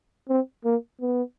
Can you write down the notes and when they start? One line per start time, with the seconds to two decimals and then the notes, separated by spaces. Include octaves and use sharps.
0.29 C4
0.65 A#3
1.01 B3